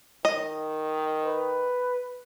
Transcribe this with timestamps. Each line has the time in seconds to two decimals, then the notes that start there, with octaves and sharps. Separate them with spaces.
0.25 D#3 D#5
1.25 B4